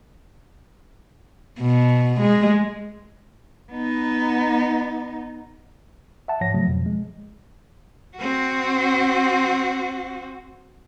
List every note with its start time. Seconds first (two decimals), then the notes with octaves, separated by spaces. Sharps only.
1.60 B2
2.21 G#3
3.72 B3 D#4
6.28 E5 F#5 A5
6.41 G#2 F3 C#5 A#6
6.54 C#3 F3 F#3 A3
6.68 F2 B2 F3
6.86 G#3
8.16 C4 F#4